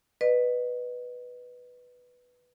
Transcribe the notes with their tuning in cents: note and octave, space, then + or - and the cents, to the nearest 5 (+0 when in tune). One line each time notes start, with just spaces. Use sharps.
B4 +0 D#5 -30